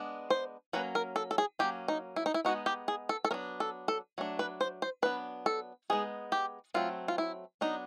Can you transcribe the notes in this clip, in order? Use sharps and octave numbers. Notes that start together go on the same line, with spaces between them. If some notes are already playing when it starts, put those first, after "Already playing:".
Already playing: G#3 B3 D4
C5
F#3 A#3 C#4 B4
A#4
A4
A4
G#4
F#3 A#3 C#4 G4
D#4
E4
D#4
E4
G#3 B3 D#4 F#4
G4
G#4
A4
A4
F#3 B3 D4 A#4
A4
A4
F#3 A3 D4
B4
C5
C5
F#3 B3 D4 B4
A4
G#3 B3 D#4 G#4
G4
F#3 A3 C4 F4
F4
E4
F#3 B3 D4 D#4